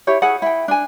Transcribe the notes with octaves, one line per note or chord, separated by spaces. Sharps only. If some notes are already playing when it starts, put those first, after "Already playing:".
E4 G4 C#5
E4 G#4 F#5
E4 G5
D4 G#5